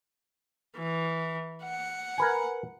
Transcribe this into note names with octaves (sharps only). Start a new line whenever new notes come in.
E3
F#5
A#4 B4 G#5